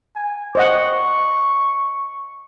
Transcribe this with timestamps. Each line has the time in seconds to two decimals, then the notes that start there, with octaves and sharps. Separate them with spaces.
0.16 G#5
0.55 C5 D#5 F#5 C#6